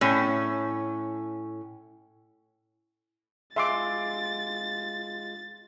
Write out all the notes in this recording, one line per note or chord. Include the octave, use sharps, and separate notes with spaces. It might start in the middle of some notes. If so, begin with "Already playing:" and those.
A2 C#4
G#3 F4 E5 C6 D6 A6